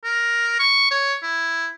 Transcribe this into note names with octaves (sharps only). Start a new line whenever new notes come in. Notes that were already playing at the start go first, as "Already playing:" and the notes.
A#4
C#6
C#5
E4